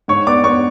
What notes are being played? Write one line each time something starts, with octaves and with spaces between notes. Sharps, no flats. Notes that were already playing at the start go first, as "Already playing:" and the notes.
G#2 C#5 C#6
B3 D5 D6
B3 C#5 C#6